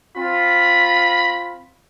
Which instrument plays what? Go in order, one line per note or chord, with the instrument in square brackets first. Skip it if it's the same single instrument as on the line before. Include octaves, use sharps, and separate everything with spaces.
[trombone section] C4 F4 [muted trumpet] B5